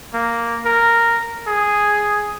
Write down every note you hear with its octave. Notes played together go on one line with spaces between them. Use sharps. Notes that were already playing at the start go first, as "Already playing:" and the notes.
A#3
A#4
G#4